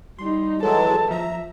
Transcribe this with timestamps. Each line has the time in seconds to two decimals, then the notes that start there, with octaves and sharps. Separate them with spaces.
0.19 G3 D#4 C6
0.63 E3 F#3 G#3 A4 A5
1.11 F3 E5 A#5